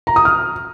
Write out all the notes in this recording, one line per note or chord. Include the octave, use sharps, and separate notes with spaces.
A#5
D#6
F6